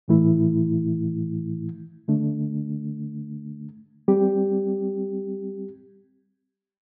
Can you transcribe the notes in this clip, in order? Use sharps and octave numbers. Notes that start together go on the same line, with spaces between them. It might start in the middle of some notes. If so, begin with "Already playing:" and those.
A2 E3 A3 E4
D3 A3 D4
G3 C4 G4